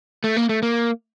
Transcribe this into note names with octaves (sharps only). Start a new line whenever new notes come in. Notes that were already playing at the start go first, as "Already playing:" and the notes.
A3
A#3
A3
A#3